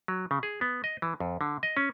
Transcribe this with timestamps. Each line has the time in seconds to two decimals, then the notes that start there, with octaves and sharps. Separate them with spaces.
0.08 F#3
0.31 C#3
0.43 G#4
0.61 B3
0.84 D#5
1.02 E3
1.20 F2
1.41 D3
1.63 D#5
1.77 C#4